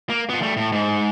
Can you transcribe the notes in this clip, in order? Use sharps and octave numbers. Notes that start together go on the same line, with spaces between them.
A#3
B3 F4
G3 A3
A2
G#2